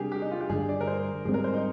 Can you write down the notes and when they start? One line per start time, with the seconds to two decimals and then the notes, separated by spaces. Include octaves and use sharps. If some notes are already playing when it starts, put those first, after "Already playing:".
Already playing: C3 G3 D4 G4 G#4 A#4
0.12 G4
0.22 D#4
0.31 F4
0.41 G4
0.49 G2 D3 G3 G#4
0.69 D5
0.81 A#4
0.87 C5
1.25 G#2 G3 C4 G#4
1.34 A#4
1.44 C5
1.54 D#4